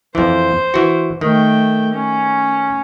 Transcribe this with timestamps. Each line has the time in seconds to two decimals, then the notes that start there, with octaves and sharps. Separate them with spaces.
0.15 F2 E3 C5
0.74 E3 F#4
1.21 D#3 A3 G5
1.93 C#4